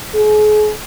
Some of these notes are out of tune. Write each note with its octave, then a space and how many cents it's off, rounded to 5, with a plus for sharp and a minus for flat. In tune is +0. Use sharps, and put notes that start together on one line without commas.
G#4 +40